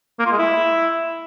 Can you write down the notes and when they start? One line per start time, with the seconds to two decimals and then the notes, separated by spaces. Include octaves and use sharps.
0.19 A#3
0.26 F4
0.32 G#3
0.38 E4